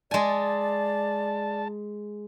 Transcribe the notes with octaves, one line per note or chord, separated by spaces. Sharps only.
G#3 D5 G#5 A5